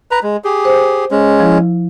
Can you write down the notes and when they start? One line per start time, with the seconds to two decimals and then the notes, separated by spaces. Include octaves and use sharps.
0.11 B4 A#5
0.23 G#3
0.44 G4 G#4
0.65 C5
1.11 G#3 C#4
1.40 F3 E4